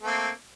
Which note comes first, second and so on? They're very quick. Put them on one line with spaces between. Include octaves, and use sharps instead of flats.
A3 C4 A#3